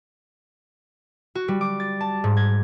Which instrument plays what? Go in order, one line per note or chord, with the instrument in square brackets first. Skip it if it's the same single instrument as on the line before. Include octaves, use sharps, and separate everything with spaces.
[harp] F#4
G3
D6
A6
A5
G#2
G#6